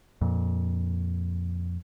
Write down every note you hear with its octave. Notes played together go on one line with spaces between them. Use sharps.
F2 A#2